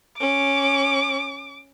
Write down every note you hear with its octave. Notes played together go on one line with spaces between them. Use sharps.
C#4 D6